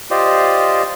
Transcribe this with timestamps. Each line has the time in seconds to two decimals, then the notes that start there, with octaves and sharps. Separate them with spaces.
0.11 F4 G4 C5 D5 D#5